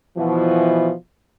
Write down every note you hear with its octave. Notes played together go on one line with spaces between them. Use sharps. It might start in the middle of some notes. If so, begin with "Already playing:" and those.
B2 E3 F3